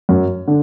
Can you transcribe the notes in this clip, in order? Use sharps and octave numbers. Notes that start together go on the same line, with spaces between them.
F#2
D3